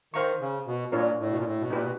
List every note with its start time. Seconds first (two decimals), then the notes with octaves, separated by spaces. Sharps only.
0.14 D#3 C5 F5 A#5 C#6
0.41 C#3
0.66 B2
0.92 A#2 D4 F4 A#4 C#5
1.19 A2
1.30 B2
1.37 A#2
1.44 A2
1.59 B2
1.70 A#2 D#4 G4 B4
1.83 B2